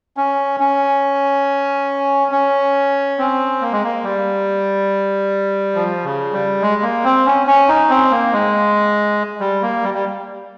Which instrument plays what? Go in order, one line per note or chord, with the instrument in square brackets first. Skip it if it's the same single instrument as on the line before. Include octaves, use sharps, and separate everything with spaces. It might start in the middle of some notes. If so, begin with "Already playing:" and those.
[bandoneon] C#4
C#4
C#4
C4
A#3
G#3
A#3
G3
F3
C#3
G3
G#3
A#3
C4
C#4
C#4
D#4
C4
A#3
G#3
G3
A#3
G3
G3